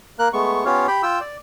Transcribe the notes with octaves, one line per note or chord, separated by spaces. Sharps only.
A#3 A#4 F#6
G#3 A3 B3 C#6
B3 C#4 F4 G4 C#5 F5
G4 G5 B5
F4 G5 E6
D5